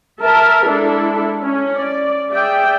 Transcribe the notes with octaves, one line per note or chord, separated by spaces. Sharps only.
A#4 E5 A5
G#3 D4 E4 A4
C#4
D5
G#4 D5 E5 G5